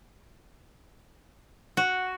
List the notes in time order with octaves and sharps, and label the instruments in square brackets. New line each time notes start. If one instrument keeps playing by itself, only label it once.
[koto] F#4